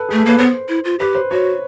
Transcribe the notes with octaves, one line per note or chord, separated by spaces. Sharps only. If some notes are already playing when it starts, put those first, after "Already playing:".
Already playing: A4 B4
A3 G#4
A4
A#3 B4
B3 C5
E4
F4
G4 B4
C5
F#4 C#5